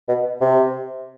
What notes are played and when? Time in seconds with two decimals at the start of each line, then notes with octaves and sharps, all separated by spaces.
0.08 B2
0.41 C3